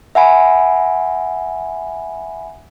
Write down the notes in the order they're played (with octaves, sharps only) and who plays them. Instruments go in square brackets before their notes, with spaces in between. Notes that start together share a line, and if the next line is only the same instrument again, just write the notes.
[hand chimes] E5 F#5 G#5 B5